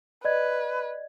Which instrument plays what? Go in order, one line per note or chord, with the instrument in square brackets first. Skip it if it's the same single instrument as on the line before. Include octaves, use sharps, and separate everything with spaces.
[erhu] B4 [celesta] D5 D#5 G#6